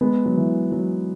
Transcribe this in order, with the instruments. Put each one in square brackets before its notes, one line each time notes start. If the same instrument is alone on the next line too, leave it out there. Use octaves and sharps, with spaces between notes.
[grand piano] G#3 B3
F#3
E3
F#3